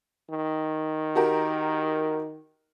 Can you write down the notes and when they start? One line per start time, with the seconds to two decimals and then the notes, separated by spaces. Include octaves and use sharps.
0.30 D#3
1.15 F#4 G4 A#4